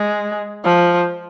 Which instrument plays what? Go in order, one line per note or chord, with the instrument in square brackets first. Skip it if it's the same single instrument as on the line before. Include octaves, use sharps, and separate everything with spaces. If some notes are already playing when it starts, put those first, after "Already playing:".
Already playing: [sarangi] G#3
F3